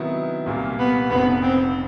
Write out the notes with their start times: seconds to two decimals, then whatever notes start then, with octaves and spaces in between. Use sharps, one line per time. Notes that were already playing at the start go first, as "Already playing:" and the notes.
Already playing: C3 D#3 F#3 B3 E4
0.46 C2 A#2 G3 A#3
0.79 B3
1.10 F1 F2 C#3 F3 B3
1.42 C4